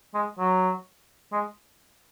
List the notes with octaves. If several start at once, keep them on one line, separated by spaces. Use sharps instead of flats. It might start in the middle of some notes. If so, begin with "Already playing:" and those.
G#3
F#3
G#3